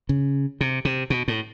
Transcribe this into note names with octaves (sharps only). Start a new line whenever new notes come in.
C#3
C3
C3
B2
A2